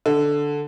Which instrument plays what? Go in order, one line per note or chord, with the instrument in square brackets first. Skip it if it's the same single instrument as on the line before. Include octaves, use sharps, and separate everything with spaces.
[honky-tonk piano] D3